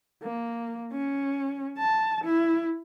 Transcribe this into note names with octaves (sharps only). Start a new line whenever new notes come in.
A#3
C#4
A5
E4